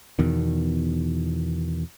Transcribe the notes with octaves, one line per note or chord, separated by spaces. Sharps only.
E2 B2 D#3